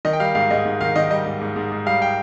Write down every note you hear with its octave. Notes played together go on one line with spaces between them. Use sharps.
D#3 D#5
G5
G3 F5
G#2 F5
G#2 D#5
G#2
D#3 F5
D#3 D#5
G3 D#5
G#2
G#2
G#2
G#2
G3 F5
G5